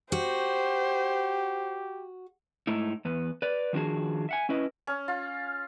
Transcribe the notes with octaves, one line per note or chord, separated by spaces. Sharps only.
F#4 G4 C5
G#2 A3 D#4 E4
E2 B3
B4 D5
D#3 F3 D4 F#4 G#4
E5 F#5 G#5
C#4 E4 B4 D#5
C#4
F4